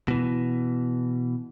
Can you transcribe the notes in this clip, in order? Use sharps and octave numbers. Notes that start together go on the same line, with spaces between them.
B2 E3